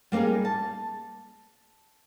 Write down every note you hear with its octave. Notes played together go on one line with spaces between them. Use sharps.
G3 A#3 D4 D#4 G#4
A5